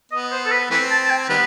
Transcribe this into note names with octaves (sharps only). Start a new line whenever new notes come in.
B3 D#5
C5
A4
B4
E3 A3 C4 B4
A5
A5
G5
D#3 G3 B3 B4